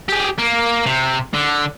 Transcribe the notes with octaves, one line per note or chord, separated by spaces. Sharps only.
G4 G#4
A#3
C3
D3